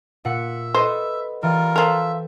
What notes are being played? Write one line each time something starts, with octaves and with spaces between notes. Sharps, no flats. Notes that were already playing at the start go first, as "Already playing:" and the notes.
A#2 E5 F#5 C#7
A4 B4 C5 D#5
E3 G3 F4 A#4
F3 A4 A#4 E5 G5